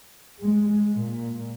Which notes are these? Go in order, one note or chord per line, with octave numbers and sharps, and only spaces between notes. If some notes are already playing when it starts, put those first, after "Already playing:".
G#3
A#2